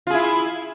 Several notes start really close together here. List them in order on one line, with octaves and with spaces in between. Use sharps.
F4 G#4 E4